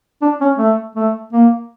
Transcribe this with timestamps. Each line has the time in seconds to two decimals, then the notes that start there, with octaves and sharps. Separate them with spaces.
0.22 D4
0.41 C#4
0.58 A3
0.96 A3
1.33 A#3